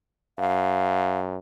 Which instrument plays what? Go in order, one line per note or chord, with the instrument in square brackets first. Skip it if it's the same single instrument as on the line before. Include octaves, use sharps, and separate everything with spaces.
[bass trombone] F#2 [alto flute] F5